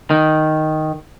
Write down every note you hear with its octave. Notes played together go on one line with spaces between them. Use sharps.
D#3